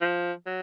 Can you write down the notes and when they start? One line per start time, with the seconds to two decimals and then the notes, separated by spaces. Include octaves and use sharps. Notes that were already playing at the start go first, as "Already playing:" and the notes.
0.01 F3
0.46 F#3